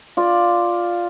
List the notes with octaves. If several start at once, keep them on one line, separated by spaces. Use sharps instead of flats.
F4 D5